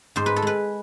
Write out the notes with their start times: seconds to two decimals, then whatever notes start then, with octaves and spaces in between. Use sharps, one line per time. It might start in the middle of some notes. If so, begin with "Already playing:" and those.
0.16 G#2 C5
0.26 B4
0.36 A4
0.42 G#3 B4